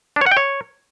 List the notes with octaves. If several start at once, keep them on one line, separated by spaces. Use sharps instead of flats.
D4
C#5
F#5
G5
C#5